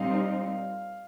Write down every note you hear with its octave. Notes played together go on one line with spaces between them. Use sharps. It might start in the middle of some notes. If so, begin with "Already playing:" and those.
Already playing: A#2 G3 C4 D#4 F5